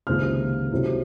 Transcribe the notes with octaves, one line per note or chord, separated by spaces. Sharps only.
C#2 C3 D#3 A#3 F6
C2 C3 F#3